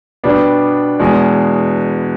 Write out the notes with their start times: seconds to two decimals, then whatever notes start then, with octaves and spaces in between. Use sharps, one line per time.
0.24 B2 G3 B3 D4
0.99 E2 B2 G#3